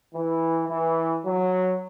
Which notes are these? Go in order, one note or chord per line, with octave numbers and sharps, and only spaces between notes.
E3
E3
F#3